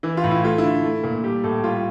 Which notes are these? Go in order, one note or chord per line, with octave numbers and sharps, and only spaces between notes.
E3 E4
F4
A2
E4
A3 F4
E4
D3
A3
A#2
G3 G4
A2 A4
G3 F4